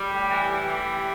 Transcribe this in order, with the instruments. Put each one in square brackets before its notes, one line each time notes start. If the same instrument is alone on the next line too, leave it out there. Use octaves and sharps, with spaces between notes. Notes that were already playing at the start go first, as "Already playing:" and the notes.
Already playing: [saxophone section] G3
A2
E3
A2 G3
E3
A2